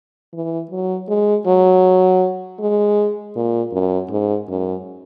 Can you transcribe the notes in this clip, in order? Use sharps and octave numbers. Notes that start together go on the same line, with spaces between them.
E3
F#3
G#3
F#3
G#3
A#2
F#2
G#2
F#2